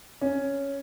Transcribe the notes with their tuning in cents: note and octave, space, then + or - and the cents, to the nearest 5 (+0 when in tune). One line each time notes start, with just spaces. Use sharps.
C#4 +5